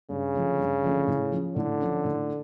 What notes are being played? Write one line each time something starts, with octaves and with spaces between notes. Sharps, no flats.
G2 C#3
D3 F3 A3 C#4
G2
D3 F3 A3 C#4
A2
F3 C#4
A2 D3
F3 C#4
A2